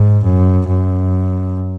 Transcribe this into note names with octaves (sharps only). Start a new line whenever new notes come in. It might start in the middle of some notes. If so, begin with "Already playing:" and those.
Already playing: G#2
F#2
F#2